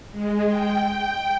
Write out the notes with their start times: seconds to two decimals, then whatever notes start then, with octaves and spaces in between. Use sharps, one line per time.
0.11 G#3
0.47 G5
0.81 G5